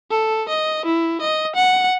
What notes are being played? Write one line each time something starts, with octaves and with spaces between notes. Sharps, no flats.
A4
D#5
E4
D#5
F#5